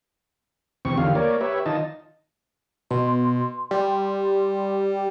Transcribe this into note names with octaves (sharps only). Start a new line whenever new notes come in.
E2 C3 C4 C#6
E2 D3 D#3 F4 G4 F5
A#3 A#4 C#5 D5
G4 B4 C#5 E5
D#3 D#4 F4 D#5 A5
B2 C6
G3